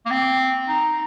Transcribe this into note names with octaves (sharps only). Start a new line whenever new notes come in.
A#3
C4
D#4